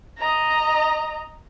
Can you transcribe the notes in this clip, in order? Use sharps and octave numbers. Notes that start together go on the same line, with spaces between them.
D#5 A#5